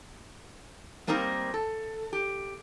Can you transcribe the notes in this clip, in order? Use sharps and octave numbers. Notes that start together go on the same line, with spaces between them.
G3 A#3 C4 D#4 A#4
A4
G4